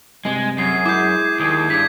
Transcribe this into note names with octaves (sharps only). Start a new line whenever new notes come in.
G2 C3 G#3
F#2 G#4 C7
G#3 E4 D6 G6
D#2 G#4
G2 G#6 B6